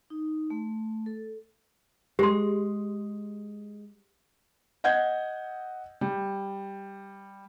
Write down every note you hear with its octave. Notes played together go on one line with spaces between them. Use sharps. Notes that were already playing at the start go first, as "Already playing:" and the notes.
D#4
A3
A4
G#3 G4 C6
D#5 F#5 G6 G#6
G3